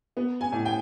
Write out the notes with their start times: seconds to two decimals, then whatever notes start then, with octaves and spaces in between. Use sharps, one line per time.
0.17 B3
0.41 G#5
0.52 A2
0.65 G5